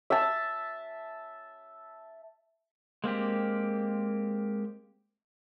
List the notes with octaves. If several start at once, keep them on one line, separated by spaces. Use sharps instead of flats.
E5 A5
G#3 A#3 C4 G4